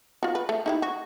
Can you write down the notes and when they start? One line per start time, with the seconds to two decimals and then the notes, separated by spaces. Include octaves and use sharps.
0.23 F4 F#4
0.35 B4
0.49 A3
0.66 D#4 E4 G4
0.82 F#4